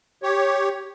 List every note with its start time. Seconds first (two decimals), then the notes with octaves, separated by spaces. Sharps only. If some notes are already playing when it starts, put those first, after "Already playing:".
0.23 G4 C#5